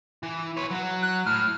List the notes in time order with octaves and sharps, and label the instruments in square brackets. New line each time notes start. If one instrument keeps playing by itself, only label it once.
[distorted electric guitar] E3
B4 C#5
F#3 F#4
[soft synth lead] F#6
[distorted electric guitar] A2 [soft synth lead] F6